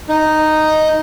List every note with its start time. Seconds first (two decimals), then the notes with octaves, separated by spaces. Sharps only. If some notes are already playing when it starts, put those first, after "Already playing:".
0.09 D#4